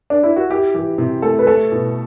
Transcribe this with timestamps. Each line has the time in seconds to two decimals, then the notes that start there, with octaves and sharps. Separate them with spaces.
0.10 D4
0.23 E4
0.36 F#4
0.50 E4 G4
0.74 E3 G4
0.98 C3
1.22 A3 A4
1.39 B4
1.47 A3 A4
1.72 B2